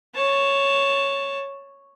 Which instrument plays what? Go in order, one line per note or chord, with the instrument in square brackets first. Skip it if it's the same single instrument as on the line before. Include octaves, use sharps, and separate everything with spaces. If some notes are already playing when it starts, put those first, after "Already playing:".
[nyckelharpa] C#5 A5